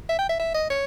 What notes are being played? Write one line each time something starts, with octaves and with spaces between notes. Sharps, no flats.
E5
G5
E5
E5
D#5
C#5